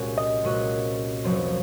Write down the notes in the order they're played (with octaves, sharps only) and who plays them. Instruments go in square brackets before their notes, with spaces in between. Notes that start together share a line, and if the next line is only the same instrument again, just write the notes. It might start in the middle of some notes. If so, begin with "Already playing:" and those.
Already playing: [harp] C2 A#2 G#3 C#4 F#4
[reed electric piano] D#5
[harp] C2 A#2 G#3 C#4 F#4
F1 F2 C3 F#3 C4